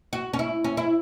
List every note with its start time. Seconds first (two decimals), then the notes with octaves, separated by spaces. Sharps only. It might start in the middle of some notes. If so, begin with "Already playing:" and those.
0.13 F#4
0.33 C#4
0.39 E4
0.64 C#4
0.77 E4